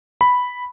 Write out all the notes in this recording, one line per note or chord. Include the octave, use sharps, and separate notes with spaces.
B5